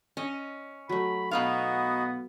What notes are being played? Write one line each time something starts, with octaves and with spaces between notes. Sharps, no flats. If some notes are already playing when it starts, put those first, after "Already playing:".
C#4 D#5
F#3 A3 B5
B2 B3 D#4 F#4 B4 F5